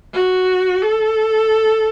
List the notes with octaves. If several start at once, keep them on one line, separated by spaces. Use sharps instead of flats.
F#4
A4